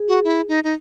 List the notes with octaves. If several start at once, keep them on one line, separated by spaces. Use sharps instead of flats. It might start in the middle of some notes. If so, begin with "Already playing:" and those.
Already playing: G#4
F#4
E4
D#4
D#4